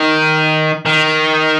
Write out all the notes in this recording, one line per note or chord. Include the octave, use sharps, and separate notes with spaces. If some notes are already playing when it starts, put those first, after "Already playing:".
Already playing: D#3
D#3